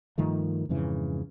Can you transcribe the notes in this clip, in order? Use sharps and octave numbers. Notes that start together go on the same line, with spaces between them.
G2 D#3 F3 A3
F2 G#2 C#3 E3